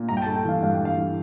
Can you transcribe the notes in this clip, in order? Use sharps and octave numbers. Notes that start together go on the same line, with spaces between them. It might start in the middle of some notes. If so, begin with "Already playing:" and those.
Already playing: A#2
G2 A#5
G5
A5
A3
G5
E3 F5
G2 F5
G5
G2
F5
E3